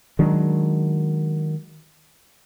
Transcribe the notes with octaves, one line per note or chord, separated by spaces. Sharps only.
D#3 F#3 G#3 D4